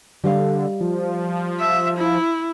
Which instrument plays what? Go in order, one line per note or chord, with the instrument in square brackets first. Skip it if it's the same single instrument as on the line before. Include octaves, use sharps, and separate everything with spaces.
[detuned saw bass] D3 [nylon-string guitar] G3 D#5 F5
[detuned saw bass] F3
[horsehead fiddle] E5
E4